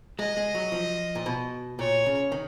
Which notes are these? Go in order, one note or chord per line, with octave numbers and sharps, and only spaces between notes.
G#3 D#5
G#3
F#3
F3
A#2
B2
A#2 C#5
C#3
D#3